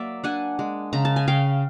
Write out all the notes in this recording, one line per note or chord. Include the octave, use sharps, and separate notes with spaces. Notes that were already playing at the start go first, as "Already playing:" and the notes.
Already playing: F#3 A#3 D5 E5
D4 F#5 G#5
G#3
C#3 A#5
A5
G#5
C#3 F5 G5